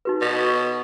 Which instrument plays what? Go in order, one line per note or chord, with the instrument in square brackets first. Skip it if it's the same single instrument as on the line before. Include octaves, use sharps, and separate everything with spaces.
[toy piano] D#4 F#4 B4
[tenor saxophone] B2
[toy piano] C#6